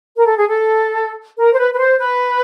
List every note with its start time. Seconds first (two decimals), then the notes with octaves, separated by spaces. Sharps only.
0.16 A#4
0.27 A4
0.37 G#4
0.48 A4
1.38 A#4
1.53 C5
1.59 B4
1.73 B4
1.79 C5
1.99 B4